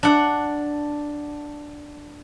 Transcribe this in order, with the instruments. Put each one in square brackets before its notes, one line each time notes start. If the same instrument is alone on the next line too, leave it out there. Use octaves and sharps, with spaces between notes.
[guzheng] D4 F#5